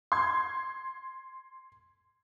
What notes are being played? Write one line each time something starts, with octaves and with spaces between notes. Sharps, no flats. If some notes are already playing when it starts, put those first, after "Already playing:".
C6 G#6